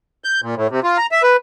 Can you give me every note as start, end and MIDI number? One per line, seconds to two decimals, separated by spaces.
0.24 0.41 91
0.42 0.55 46
0.56 0.67 45
0.70 0.80 48
0.84 0.98 65
0.98 1.06 82
1.12 1.22 76
1.23 1.36 71